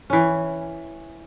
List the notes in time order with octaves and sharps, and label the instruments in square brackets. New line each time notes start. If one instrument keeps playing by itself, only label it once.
[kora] E3 C#4